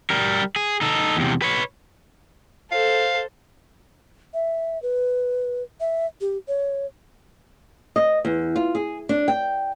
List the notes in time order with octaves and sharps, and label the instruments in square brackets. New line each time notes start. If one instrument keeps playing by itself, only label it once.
[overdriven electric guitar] G3 A#4
G#4
D#4 A4
E2 C3
B4 C#5
[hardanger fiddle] A4 C5 [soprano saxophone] F5
[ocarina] E5
B4
E5
G4
C#5
[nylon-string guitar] D#5
E2
F4
G#4
D4
G5